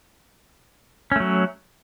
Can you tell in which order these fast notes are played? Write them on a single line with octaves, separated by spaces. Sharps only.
C#4 A3 F#3